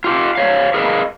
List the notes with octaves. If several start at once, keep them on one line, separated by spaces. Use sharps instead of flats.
F4 G4
C5 C#5 F5
G#4 A#4 B4 D#5 F5